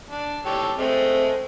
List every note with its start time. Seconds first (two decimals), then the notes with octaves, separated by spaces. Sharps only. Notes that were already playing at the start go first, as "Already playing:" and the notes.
0.10 D4
0.46 G4 A4 C#5
0.78 G#3 A3 C4